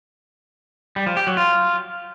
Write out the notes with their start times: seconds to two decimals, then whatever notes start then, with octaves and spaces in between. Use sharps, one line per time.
0.96 G3
1.06 F3
1.17 G4
1.27 F#3
1.37 F4